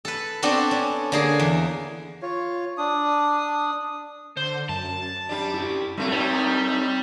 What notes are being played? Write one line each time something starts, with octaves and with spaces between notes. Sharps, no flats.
A4 B4
B3 C4 D4 F#4 A4
C#4
D3 A#3 G#4
E2
F4 C#5
D4 D#6
D3 C5
F#2 A5
G3 D4
E4 G4
F#2 G3 A3 C4
G3 C4 D#4 C#5